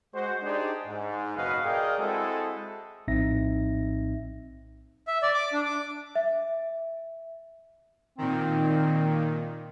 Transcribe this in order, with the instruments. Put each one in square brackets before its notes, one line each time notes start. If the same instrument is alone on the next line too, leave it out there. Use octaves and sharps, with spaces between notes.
[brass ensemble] G#3 F#4 C5
D4 D#4 G4 G#4 C5 D5
G#2
F#1 B2 F#4 B4 D#5 F5
G#4 A#4 D5 D#5 F5 G5
G#3 C4 E4 F#4 G#4 A4
[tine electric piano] A#1 A2 C4 D#4 E5 A#6
[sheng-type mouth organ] E5
D5
D6
D4
D6
[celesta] E5
[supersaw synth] A#2 D#3 [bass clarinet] C4